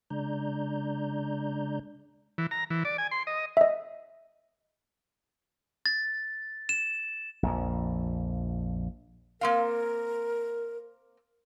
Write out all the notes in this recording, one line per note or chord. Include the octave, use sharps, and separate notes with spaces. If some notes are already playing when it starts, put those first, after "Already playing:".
C#3 G#3 D4 D5 A#5 G6
E3
A#5
E3
D5
G#5
C6
D#5
D#5 E5
A6
E7
A#1 F2
A#3 C4 A#4 F5